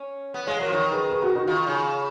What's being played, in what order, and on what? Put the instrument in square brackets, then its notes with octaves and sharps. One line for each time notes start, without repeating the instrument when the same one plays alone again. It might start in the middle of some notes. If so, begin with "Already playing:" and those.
Already playing: [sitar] C#4
B3
[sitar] G#3 [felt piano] C#5 F5
[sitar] F#3 [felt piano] A#4 C#5
[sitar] F3
[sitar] D#3 [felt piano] A#4 C#5
[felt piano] G#4 B4
G#4 B4
F#4 A#4
D#4 F#4
[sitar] D#3 [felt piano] F4
[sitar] C#3